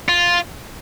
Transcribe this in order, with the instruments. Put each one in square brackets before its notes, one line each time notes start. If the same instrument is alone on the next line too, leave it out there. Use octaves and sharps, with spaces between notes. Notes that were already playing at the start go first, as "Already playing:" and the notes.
[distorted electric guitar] F4